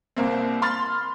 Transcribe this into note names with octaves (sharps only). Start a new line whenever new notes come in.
C2 A#3 C4
B5 C6 F6 A6